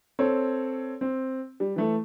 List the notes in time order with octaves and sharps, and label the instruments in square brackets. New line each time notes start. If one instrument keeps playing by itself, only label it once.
[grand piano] C4 A4 C#5
C4
G3
E3 A3 A4